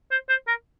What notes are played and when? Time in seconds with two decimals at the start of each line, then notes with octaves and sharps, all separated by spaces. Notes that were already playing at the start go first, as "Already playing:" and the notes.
0.11 C5
0.29 C5
0.48 A#4